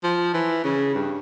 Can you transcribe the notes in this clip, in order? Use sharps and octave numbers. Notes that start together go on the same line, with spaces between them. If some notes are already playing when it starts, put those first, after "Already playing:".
F3
E3
C#3
G2